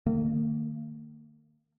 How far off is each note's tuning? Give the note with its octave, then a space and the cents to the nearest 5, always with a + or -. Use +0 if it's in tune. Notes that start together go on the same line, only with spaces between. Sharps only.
D#3 -35 A#3 -40